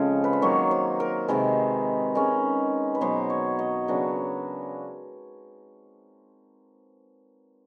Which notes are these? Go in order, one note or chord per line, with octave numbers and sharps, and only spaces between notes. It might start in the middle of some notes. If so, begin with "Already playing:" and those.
Already playing: C#3 F3 G#3 C4 A4
B4
C5
D#3 F#3 A#3 D#4 C#5
C5
A#4
C3 D#3 G#3 B4
D#3 G#3 C#4
B4
B2 F#3 B3 C5
C#5
D#5
C#3 F#3 B3 D4